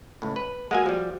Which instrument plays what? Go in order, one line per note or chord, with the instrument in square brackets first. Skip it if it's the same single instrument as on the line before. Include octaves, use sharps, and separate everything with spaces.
[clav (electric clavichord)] C#2 A2
B4
[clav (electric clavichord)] G#3 A#3 G#5 [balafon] F#4 F#5
[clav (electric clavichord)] F3 G3